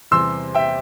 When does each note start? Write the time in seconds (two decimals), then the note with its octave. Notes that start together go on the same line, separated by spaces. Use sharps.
0.11 E2 C3 G3 C6 E6
0.55 E5 G5